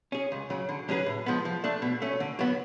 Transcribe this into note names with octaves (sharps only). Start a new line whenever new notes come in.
C#4 G#4
C#2
C#3 F#3
D3
F#3 C#4 G#4 B4
A2
F3 G#3 B3
F3
A3 D4
B2
A3 C#4
D3
F#3 B3